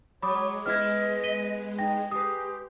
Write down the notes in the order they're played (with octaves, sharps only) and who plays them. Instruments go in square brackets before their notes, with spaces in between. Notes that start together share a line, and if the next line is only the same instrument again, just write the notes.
[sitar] F#3 [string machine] G#3 [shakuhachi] C#5 [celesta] B5 D6 D#6
[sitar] B3 E4 B4 [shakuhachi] D#5 [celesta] F6 G#6
[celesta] B6 D#7 G7
[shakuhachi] D#4 [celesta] G5 A#6
[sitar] G#3 B4 [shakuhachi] G4 [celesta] D#6